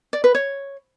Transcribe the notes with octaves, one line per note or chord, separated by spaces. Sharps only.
D5
B4
C#5